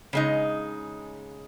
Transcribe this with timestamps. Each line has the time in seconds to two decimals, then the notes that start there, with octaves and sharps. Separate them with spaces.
0.13 C#3 G#3 D#4